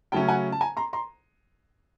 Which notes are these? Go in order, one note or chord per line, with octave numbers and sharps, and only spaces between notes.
C#3 F#3 A3 C#4 G5 A5
F#5 G#5
A5
G#5 A#5
A#5 C6
A#5 C6